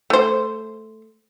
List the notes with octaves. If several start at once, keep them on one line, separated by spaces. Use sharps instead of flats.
A3 C5